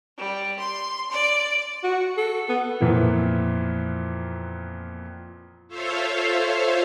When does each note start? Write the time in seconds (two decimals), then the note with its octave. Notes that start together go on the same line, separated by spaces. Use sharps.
0.18 G3
0.58 C6
1.11 D5
1.83 F#4
2.17 A4
2.49 B3
2.80 F2 A#2 E3 B3
5.68 F4 A4 C5 C#5 E5 F5